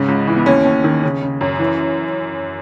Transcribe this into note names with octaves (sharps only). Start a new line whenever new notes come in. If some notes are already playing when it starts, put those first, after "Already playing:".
Already playing: G#2 C#3
C#2
E3
B3
D#2 C#4
D#2
D#3
C#3
C#3
F#2
E3